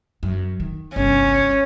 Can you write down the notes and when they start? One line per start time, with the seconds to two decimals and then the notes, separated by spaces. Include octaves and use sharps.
0.23 F#2
0.60 D#3
0.96 G1 C2 C#4